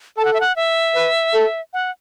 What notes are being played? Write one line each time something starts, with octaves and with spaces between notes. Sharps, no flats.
A4 A5
F#5
E5
F#5
E5
B4
A4
F#5